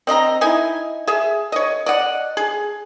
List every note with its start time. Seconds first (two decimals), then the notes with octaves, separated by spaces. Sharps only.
0.07 C4 D#5 E5 A#5
0.41 D#4 E4 G#5
1.07 G#4 E5
1.52 C#5 D#5
1.86 D5 D#5 F#5
2.37 G#4